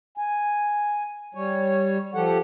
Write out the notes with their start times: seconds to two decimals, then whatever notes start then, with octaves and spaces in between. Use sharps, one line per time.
0.18 G#5
1.35 G3 C#5
2.15 F3 G4 A4 F#5